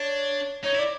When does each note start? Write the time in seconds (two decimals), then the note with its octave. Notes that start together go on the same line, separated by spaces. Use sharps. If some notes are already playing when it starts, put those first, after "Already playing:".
Already playing: D4 C#5
0.64 D#4 C#5
0.75 E4
0.78 D5